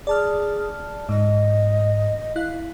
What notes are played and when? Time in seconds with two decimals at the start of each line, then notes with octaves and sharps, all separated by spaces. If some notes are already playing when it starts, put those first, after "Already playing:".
0.07 G#4 D5 A5 F6
1.09 G#2 D#5
2.36 E4 F5 F#6